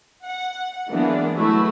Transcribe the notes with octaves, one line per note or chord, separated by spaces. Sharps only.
F#5
E3 F#3 G#3 A#3 B3 D4
F#3 G#3 A3 E4 F#4 B4